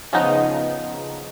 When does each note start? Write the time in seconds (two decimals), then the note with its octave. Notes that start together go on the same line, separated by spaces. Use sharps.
0.13 C#3 F3 B3 D#4